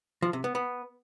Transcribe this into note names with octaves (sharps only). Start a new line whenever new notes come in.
F3
C3
B3
B3